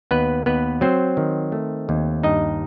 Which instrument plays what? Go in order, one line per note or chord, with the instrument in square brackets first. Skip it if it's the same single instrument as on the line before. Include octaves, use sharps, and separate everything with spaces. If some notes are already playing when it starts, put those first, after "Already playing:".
[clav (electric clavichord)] D#2 B3 B4
D#2 B3 B4
F#3 C4 C5
D#3
A3
D#2
G2 D#4 D#5